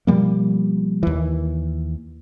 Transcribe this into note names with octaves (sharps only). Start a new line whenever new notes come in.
B2 F3 G3 A#3
D#2 E3